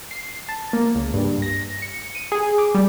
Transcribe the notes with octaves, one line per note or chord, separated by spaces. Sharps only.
C7
A5
A#3
C#2
G2
A#6
C#7
D#7
G#4
D6
G3